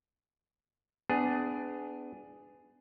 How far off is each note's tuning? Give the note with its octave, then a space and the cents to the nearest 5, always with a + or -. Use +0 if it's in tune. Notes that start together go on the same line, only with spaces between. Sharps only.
B3 +30 D4 +0 G#4 +0